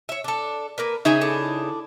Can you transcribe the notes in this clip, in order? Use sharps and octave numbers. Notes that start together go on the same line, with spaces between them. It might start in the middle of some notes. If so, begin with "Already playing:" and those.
C#5 E5
D4 A4
A#3 A#4 B4
C#3 D#4 G#4 E5 G#5
D4 E4 A4